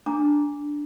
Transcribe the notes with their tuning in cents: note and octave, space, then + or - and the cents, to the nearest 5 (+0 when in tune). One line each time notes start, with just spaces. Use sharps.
D4 +0 A#5 +0 D6 -10